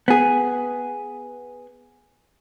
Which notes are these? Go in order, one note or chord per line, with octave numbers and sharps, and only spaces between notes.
B3 G#4